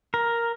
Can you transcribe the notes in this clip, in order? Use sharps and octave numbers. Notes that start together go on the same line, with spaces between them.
A#4